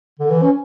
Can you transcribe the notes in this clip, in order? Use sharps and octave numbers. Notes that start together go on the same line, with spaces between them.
D3
E3
C#4